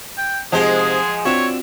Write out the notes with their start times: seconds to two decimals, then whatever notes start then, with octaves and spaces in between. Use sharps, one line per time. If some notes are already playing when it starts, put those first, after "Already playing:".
0.18 G5
0.52 G#2 C3 F3 G#3 G#4 F#5
1.25 C4 D4 F4 F#4 C#5 E5